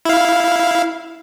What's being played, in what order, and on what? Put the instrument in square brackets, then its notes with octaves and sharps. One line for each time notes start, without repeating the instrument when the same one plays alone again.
[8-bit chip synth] E4 F5